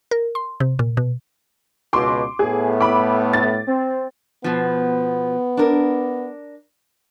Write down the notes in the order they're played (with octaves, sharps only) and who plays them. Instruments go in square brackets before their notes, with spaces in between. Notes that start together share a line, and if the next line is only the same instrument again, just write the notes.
[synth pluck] A#4
C6
C3
A#2
B2
[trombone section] C#2 B2 [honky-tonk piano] C6 D6
[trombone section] A2 A3 B3 [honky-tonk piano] G#4
[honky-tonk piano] B5 D6
A6
[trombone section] C4
[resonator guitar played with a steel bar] B2 F3 [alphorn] B3
[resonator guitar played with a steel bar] D4 A#4